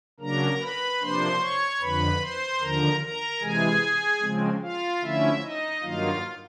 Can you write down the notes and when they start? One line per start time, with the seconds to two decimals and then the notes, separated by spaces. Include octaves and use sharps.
0.20 C#3 F#3 A#3 D4 A#4 A#5
0.61 B4 B5
1.00 C3 F3 A#3 D4 C5 C6
1.40 C#5 C#6
1.81 F2 D3 F3 B4 B5
2.21 C5 C6
2.61 D#2 D3 F3 A#4 A#5
3.01 A#4 A#5
3.40 C3 E3 G#3 G#4 G#5
4.21 C#3 F3 G#3 C4
4.61 F4 F5
5.01 D3 F3 A3 C#4 E4 E5
5.41 D#4 D#5
5.81 G2 D#3 F#3 A#3 D#4 F4 F5